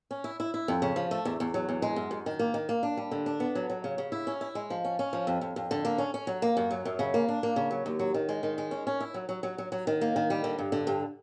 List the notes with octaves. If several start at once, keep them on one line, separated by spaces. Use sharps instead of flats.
C#4
E4
E4
E4
F2
C#3
F3
A3
E2
E2
F#3
E2
G#3
F#2
F#2
D#3
A#3
D#3
A#3
D4
G3
D3
D4
B3
F#3
F#3
C#3
C#3
E4
C#4
E4
G#3
F3
C#4
C#4
F3
F2
F2
F2
D3
A#3
C#4
C#4
F#3
A#3
F#2
F#3
F#2
C#3
A#3
D4
A#3
C#3
F#3
D#2
F#3
D#3
G#3
D#3
G#3
C#4
C#4
E4
F#3
F#3
F#3
F#3
F#3
D#3
A#3
D#3
G3
D3
G2
D3
G2